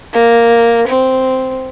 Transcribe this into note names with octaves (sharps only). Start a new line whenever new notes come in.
A#3
C4